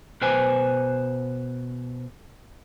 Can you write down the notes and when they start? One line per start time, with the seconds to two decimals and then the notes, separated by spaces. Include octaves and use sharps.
0.22 B2 B4 C5 G5 G#5